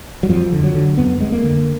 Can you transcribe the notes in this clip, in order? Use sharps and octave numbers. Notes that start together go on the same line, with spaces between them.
F#3
F2 F3
D3
F#3
D3
F2 B3
F2 G#3
A#3
D3